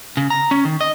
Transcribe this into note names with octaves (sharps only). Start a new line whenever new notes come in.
C#3
A#5
C#4
D#3
D#5